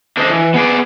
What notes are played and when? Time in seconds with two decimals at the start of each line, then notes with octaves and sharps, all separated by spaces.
0.17 D4 A4 C5 D#5
0.30 E3
0.54 B3 G#4 D5